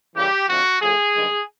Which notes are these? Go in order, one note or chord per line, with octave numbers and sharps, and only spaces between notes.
C#3 E3 G3 A#3 G4
D3 F3 A3 C4 F4 F#4
A2 F3 A3 G#4
G2 D#3 G#3